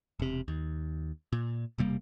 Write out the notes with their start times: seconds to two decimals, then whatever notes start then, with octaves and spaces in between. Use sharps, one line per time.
0.19 E1 C3
0.48 D#2
1.32 A#2
1.78 E1 C3 G3 A#3